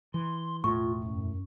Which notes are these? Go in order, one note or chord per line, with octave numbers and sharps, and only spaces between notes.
E3 C6
E1 A2 F4 C#6
F#2